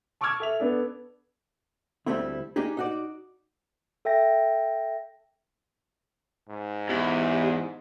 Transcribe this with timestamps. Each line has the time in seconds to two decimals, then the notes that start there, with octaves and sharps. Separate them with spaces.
0.21 A5 C#6 D6 E6 F6 G#6
0.40 A4 E5 F7
0.60 B3 D4 A4
2.06 D2 F3 G3 A3 C4 E4
2.56 A#3 D4 D#4 G4 G#4
2.77 D#4 F#4 D5
4.05 A4 E5 G5 A#6
6.49 G#2
6.89 E2 G4